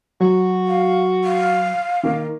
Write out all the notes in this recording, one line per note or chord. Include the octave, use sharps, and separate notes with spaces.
F#3 F#4
F5
F5
D#3 A#3